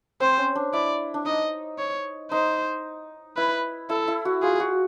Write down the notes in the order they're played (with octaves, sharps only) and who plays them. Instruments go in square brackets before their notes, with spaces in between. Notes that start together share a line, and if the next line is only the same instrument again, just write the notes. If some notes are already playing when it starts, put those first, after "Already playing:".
[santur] C4 [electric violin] C5
[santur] C#4
D4
[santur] E4 [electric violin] D5
[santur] D4
[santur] D#4 [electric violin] D#5
[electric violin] C#5
[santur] D#4 [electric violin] C5
[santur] E4 [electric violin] B4
[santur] E4 [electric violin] A4
[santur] E4
F#4
[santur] F4 [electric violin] G#4
[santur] F#4